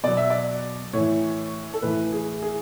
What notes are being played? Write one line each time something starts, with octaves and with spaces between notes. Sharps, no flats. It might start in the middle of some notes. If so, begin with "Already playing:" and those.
B2 F#3 D5
E5
D5
A2 E3 C#5
A4
A2 E3 B4
G#4
G#4